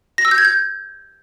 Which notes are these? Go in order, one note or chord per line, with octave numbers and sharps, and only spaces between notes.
A#6
E6
G6
G#6
G6